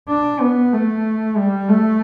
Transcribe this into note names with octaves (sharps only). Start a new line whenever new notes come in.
D4
B3
A3
G3
A3